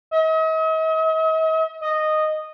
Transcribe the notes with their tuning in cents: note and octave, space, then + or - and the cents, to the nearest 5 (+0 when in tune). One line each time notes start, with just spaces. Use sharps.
D#5 +45
D#5 -10